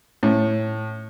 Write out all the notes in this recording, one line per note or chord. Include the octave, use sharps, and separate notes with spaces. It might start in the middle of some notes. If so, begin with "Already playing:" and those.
A2